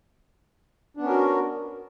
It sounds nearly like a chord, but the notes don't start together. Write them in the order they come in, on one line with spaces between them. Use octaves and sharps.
D4 B3 C#4 A#4 F#4